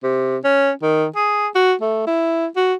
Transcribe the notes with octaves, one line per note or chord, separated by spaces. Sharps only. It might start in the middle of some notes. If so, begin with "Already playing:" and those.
C3
C#4
D#3
G#4
F#4
A3
E4
F#4